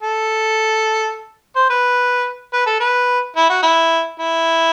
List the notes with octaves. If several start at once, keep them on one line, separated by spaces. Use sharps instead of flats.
A4
C5
B4
B4
A4
B4
E4
F#4
E4
E4